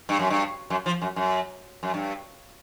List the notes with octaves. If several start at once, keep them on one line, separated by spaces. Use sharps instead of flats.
G2
F#2
G2
F#2
F3
F#2
F#2
F#2
G2